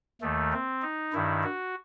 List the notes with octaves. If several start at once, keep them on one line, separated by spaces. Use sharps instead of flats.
D#2 D#3 A3
C4
D#4
G2 D#3 E4
F#4